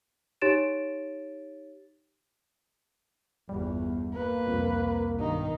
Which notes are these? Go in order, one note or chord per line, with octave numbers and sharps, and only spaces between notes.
D#4 G4 C#5 A6 D7 E7
G1 E2 G3
A#3 B4
C2 F2
B1 G2 D#3 D#4